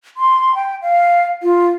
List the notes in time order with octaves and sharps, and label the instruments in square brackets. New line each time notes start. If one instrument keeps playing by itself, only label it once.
[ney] C6
G5
F5
F4